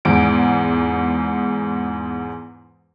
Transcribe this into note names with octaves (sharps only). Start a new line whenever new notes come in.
E2 G#2 D7